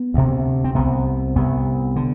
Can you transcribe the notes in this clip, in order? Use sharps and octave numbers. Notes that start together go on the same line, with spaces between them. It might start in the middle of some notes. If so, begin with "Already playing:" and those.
Already playing: B3
D2 C3
C4
C2 C3 B3
C2 C3 B3
D3